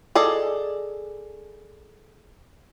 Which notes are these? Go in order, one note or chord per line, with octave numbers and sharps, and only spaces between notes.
G#4 A4 D5 D#5